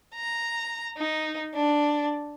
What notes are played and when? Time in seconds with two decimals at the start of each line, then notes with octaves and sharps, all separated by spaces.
0.15 A#5
0.98 D#4
1.54 D4